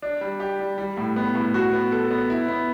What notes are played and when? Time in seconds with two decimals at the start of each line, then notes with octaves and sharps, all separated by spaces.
0.02 D4
0.21 G3
0.40 G4
0.59 G3
0.78 G3
0.97 A2
1.16 B3
1.35 A2
1.54 F#4
1.73 B3
1.92 A4
2.11 B3
2.30 E4
2.48 B3